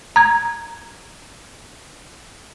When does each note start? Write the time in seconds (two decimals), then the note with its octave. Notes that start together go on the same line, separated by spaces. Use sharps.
0.16 A#5 G#6